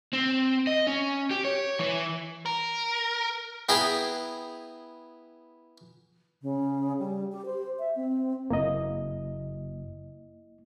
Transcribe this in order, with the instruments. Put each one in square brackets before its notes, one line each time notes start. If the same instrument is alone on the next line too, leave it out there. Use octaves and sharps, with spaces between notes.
[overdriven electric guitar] C4
D#5
C#4
G4
C#5
E3
[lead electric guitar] A#4
[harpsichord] B3 E4 G#4 B4 G5 A#5
[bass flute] C#3
G3
G4
C5
E5
C4
[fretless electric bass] F#1 [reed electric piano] A#3 E4 D#5